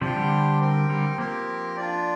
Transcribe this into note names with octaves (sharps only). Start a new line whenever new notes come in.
C3 F3 D4 G4 C5 G5
D3 G3
C4 A#4 G5
D3 G3
F3 A#3 C4 G4 A#4
D4 F4 D5